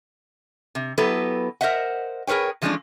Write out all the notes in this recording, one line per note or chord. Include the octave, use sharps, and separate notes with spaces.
C3
F#3 B3 E4 G4 A4 B4
A#4 C5 D#5 E5 F#5
G#4 A#4 B4 C#5 G5
E3 F3 G#3 A3 C#4 D4